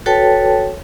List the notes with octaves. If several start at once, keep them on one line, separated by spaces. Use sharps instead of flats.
F#4 A4 B4 C#5 G5 A5